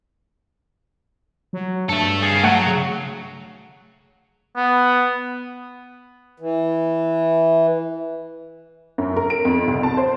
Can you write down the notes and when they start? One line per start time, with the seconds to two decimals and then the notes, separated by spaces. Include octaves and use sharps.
1.53 F#3
1.89 G2 A3 A4
2.22 G#4 F5
2.44 F#3 A3 F#5
2.66 C#3
4.56 B3
6.40 E3
8.98 F#2
9.17 A#4
9.30 D7
9.45 F2
9.67 C2
9.83 A5
9.97 C5